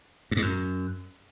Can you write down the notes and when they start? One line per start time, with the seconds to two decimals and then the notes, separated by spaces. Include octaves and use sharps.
0.31 G2
0.37 G#2
0.42 F#2